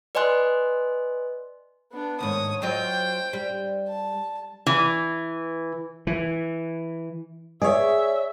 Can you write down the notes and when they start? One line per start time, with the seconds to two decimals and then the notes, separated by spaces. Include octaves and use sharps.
0.15 B4 D5 D#5 G#5 C6 F#6
1.92 B3 D4
2.21 D#2 G#2 C#5 D#6
2.62 F#3 F4 C5 D#5 G5
3.33 G3
3.88 A5
4.66 E3
6.07 E3
7.62 G#4 C#5 D5 E5